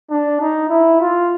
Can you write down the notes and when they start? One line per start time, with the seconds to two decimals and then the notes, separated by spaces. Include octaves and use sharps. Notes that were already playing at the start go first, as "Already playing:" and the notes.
0.10 D4
0.41 D#4
0.70 E4
1.01 F4